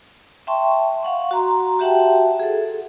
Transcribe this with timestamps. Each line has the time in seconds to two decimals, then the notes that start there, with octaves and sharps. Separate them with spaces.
0.47 E5 G5 A5 C6 C#6
1.03 F5 F#5 C#6
1.31 F#4 A#5 C6
1.79 F#4 G4 E5 F#5 G5 A5
2.40 G#4 A4